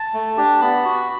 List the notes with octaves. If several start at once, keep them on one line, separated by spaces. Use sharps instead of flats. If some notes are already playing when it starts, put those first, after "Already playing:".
Already playing: A5
A3
D4 G4
B3 B5
F#4